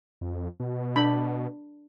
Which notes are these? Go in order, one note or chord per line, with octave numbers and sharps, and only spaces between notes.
F2
B2
D4 B5